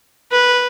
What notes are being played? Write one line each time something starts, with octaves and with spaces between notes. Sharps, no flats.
B4